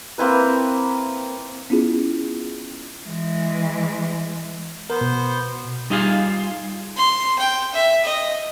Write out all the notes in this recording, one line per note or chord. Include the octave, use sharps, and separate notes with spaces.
A#3 C4 E4 B4
B3 C#4 E4 F4 G#4
E3 G#3
B3 A#4 C5
B2
G3 D#4 F4 G#4 F5
C6
G5
E5
D#5